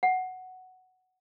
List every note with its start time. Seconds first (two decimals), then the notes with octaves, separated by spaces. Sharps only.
0.03 F#5